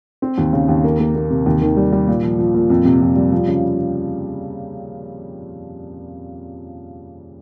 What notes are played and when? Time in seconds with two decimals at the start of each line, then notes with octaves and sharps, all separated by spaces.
0.22 C4
0.38 D#2
0.53 C#3
0.69 D#2
0.84 A#3
1.00 A#3
1.15 A#3
1.30 C3
1.46 D#2
1.62 D#3
1.77 G3
1.92 G3
2.08 A#2
2.23 F3
2.39 F3
2.55 A#2
2.70 F2
2.85 C3
3.01 F2
3.16 G3
3.32 F3
3.47 C#3